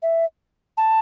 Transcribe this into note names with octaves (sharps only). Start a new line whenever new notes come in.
E5
A5